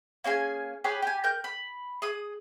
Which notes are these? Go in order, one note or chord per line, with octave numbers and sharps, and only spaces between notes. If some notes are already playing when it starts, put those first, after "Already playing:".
A#3 C#4 G#4 G#5
G4 G#4 B4 C#5
G4 G#5
A#4 G6
B5
G#4 D#6